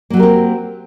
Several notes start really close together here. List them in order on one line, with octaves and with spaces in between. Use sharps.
A#3 F#3 G4 A#4 C4